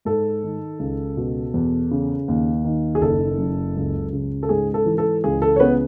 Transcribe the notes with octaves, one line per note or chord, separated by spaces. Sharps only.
G#2 A4
D#3
C#2
B2
E2
C#3
D#2
D#3
G#4
F#1 A4
F#2
C#2
C#3
A4
G#2 G#4
A4
E3
A4
C#2 G#4
A4
C#5
C#3 B3 B4